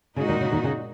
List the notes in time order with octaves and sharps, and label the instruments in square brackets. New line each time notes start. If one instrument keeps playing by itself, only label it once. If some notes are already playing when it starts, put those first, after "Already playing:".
[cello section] A#2 G#3 D#4 F#4 [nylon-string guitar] C#3
[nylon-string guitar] D#2 D#3
C#3
D#2 D#3
C#3